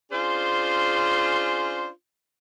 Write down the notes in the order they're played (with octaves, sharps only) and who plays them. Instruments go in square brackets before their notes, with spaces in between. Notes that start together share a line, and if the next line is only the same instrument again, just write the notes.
[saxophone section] C#4 D4 F4 G#4 C5